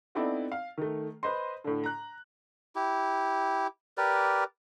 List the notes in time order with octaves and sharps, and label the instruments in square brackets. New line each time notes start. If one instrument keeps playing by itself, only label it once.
[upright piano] B3 C4 D#4 E4 A4 D5
F5
D#3 A3
B4 C5 D#5 C6
A2 D3
A#5 F#6
[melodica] E4 G4
G4 A#4 B4 D5